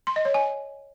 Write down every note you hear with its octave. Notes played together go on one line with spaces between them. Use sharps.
C6
D#5
C#5
G#5